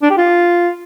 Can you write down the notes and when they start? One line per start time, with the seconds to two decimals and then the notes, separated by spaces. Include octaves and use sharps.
0.02 D4
0.10 G4
0.18 F4